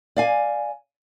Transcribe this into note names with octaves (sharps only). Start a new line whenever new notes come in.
D5 F5 G#5